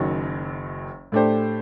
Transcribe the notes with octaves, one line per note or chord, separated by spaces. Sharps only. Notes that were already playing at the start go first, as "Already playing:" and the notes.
Already playing: F#1 F#2 D#3 F#3
A2 A3 D4 G4 C5